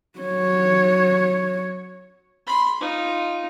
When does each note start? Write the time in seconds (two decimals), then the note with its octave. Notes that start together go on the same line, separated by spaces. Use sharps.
0.19 F#3 C#5
2.47 B5 C6
2.81 D#4 F4